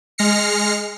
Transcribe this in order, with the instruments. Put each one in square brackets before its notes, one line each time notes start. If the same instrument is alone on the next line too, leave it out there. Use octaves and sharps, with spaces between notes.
[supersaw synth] G#3 F6 A#6 C7 C#7